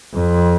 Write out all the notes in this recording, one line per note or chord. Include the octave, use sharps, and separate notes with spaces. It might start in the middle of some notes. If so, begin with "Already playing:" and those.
F2